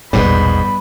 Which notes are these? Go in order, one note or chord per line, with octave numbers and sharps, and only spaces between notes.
E1 A#1 G#2 B2 G3 B3 B5